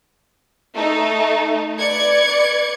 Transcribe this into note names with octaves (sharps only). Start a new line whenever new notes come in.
A3 D#4 A4
B4 D5 G#6 C#7